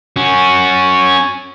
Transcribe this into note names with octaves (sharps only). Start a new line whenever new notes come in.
C#4 F#4